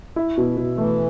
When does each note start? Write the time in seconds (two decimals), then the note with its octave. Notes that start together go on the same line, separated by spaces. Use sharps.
0.16 E4
0.38 B2
0.57 B2
0.78 E3 A3